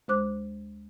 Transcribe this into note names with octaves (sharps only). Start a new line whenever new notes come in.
D2 G#3 C5 D6 F#6